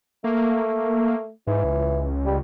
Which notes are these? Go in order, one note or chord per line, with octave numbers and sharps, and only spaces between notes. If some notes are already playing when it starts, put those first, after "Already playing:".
A3 A#3
G#2 E3
C#2
G3